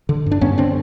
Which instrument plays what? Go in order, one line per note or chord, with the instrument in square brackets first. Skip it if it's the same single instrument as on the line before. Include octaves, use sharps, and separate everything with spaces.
[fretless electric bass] D3
G2
D4
G2 B3 C#4
D3 C4 D4